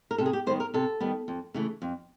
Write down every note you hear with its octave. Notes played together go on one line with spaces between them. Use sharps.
A#4
C3 A4
G#4
G4
D#3 G3 B3 C5
A#4
C3 A4
D#3 G3 B3
F2
C#3 E3 A3
F2